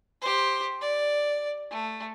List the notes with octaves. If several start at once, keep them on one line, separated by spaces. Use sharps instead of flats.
G4 C5
D5
A3